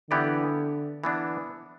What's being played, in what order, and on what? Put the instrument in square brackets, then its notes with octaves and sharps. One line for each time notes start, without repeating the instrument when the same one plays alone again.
[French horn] D3 [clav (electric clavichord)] E3 B3 E4 G4 D5
[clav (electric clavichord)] E3 B3 D4